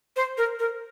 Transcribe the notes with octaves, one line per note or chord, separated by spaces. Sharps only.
C5
A#4
A#4